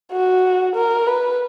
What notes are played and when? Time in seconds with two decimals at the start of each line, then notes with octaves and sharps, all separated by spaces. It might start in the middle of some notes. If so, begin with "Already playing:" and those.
0.12 F#4
0.76 A#4
1.07 B4